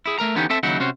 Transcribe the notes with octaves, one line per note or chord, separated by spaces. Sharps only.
E4 G#4
A3 A#4 A#5
D3 E3 B3 C#4 D#4 G4
C4 A4 E5 A5
D#2 C#3 F#3 D#4 E4 F#5
C3 C#4 F#4 C5